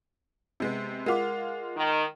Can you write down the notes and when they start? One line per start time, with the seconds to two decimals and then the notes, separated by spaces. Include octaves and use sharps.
0.60 C3 G#3 B3
1.06 G#3 F4 A#4 F#5 D6
1.77 D#3